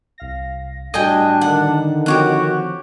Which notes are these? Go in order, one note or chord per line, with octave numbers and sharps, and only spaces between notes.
C2 F5 A#6
A2 G3 D4 F#4 D#5 G5 G#5
D3 D#3 F#5
F3 C4 F#4 G4 C#5 F#5